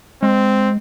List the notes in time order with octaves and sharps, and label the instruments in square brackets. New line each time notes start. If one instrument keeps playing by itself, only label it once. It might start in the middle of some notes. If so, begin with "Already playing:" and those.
[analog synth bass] G#3 [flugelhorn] C4